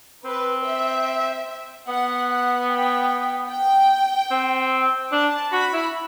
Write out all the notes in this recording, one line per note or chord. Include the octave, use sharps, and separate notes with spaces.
C4 B4
E5
B3 F#5
F#5
G5
G5
C4
D4 A5
F#4 B5
E4